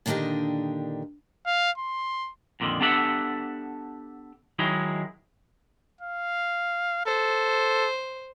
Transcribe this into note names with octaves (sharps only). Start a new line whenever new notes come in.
A#2 D3 D#3 D4 G4 D#5
F5
C6
F2 A#2 D3 D#3
B3 D4 G4 A4 E5 F#5
D#3 F#3 G#3 D#4 E4
F5
A4 C5